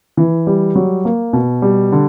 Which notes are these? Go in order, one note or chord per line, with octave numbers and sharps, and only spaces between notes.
E3
G3
F#3
A#3
B2
G3
D3